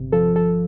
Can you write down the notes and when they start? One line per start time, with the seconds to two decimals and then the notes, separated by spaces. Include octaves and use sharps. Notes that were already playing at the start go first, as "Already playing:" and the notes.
Already playing: G1 C3
0.12 F3 A4
0.36 A4